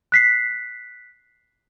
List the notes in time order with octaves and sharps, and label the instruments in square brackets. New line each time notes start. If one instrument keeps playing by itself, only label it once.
[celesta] F#6 B6 C7